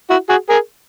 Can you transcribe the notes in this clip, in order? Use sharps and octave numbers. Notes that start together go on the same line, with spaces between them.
E4 F#4
F#4 G#4
G#4 A#4